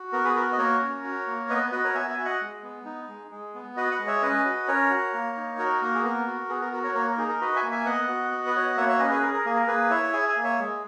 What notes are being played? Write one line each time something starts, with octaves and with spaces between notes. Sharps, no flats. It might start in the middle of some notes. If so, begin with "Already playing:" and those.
Already playing: F#4
B3 A#4
G#4 B4
F#4 A#4
D#5
A#3 A#4 C#5
C#4
F#4
A#3
B3 B4 D#5
F#4 B4 D#5
A#4 C#5
B3 E5 G#5
E5 G#5
F#4
D#5 F#5
G#3
B3
D#4
G#3
G#3
B3
F#4 B4 D#5
D#5 F#5
G#3
C#5 E5
C#4 B4 D#5
F#4
C#4 A#4 C#5
F#4
A#3
D#4
F#4 A#4
A#3 A#4
G#4
B3 A#4
F#4
B3 G#4
A#4
F#4 A#4
A#4 C#5
A#3 A#4 C#5
A#4
D#4 G#4
A#4
F#4 B4 D#5
E5 G#5
A#3
E5 G#5
B3 D#5 F#5
F#4
B3
B4
F#4 C#5
D#5
A#3 C#5 E5
C#5 E5
C#4 B4 D#5
G#4 B4
G#4 A#4
A#4
A#3 G#4
A#4
A#3 G#4 B4
E4 C#5 E5
G#4 E5 G#5
E5 G#5
A#3
C#5 E5
G#3